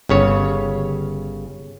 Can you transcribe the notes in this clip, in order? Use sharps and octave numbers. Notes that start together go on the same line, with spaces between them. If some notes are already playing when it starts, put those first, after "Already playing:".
G1 C#3 C#5